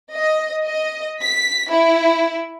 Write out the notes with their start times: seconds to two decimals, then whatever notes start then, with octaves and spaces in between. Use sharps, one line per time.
0.13 D#5
0.65 D#5
1.22 B6
1.70 E4